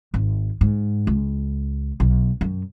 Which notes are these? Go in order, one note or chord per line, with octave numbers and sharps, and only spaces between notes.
G#1
G#2
C#2
B1
F#2